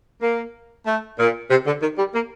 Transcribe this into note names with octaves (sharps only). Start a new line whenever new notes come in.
A#3
A3
A#2
C3
D3
D#3
G3
A#3